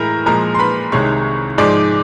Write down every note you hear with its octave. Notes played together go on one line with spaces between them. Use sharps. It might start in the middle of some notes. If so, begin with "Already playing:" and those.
Already playing: A2 E3 G#3 A#4 A#5 B5
A#2 F3 G#3 A#4 A#5
C6
B4 B5
C2 C3 D#3 G#3 C#5 C#6
G#2 F3 G#3 D5 D6